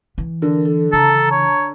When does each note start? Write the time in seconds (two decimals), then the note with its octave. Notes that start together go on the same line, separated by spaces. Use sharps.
0.18 E3
0.42 D3 A#4
0.66 A4
0.93 C#3 E3 A4 A5 A#5
1.32 C#5